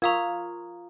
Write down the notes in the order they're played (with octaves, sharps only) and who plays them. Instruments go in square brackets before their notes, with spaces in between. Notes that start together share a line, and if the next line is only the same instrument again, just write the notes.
[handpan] F4 [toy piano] A#4 F5 C#6 [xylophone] A#5 D#6 G#6